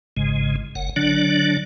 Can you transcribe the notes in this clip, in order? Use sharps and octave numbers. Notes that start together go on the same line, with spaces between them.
G#1 G#2 C#3 G#3
F#1 F#5
D3 F#3 D4 D5